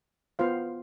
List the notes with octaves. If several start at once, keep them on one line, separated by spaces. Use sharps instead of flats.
B3 F4 C5 F5